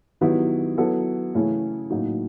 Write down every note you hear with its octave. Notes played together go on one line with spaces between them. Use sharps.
D#3 F#3 B3 E4 G4
F#3 B3 E4 A4
C#3 E3 A3 C#4 E4
A2 F#3 A#3 D#4